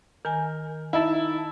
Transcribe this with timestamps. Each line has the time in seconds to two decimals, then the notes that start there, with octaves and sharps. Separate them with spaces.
0.25 D#3 A#4 G#5
0.93 D#4 E4 A5